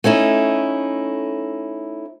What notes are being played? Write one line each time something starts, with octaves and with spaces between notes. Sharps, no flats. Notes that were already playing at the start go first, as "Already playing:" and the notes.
A3 C#4 D#4 E4